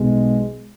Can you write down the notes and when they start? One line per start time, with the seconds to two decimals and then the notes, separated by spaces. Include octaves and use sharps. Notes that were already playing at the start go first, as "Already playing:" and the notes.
Already playing: B1 B2 G#3